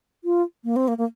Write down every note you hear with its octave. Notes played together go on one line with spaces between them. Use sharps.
F4
A#3
C4
A#3
A#3